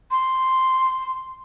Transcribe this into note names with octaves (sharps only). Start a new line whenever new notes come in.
C6